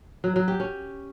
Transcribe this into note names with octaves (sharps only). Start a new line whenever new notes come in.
F#3
F#3
G4
C#4